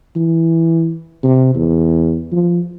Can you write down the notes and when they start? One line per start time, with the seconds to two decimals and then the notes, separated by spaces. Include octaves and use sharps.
0.16 E3
1.23 C3
1.55 E2
2.32 F3